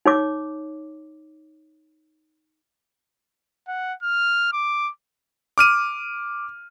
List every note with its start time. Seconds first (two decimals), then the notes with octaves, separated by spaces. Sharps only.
0.06 D#4 C#5 D6
3.68 F#5
4.03 F6
4.53 D6
5.58 D6 F6 D#7